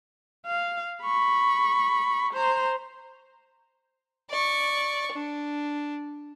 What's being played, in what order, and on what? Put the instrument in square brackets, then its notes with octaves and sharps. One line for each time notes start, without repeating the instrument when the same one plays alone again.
[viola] F5
B5 C#6
C5 A#5
[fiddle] D5 C#6
D4